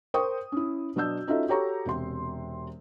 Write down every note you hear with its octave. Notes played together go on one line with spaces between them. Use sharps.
A#4 C5 G5 C#6 D#6
C#4 E4
B2 F#3 D4 E6 G6
C#4 D#4 F4 F#4 A4 E5
F#4 G4 A4 C#5 A#5 C#6
E1 C3 C6